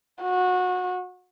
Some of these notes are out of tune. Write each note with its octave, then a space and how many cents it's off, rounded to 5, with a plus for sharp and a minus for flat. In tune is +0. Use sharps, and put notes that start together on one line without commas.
F#4 -25